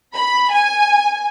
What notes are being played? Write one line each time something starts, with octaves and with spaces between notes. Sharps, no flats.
B5
G#5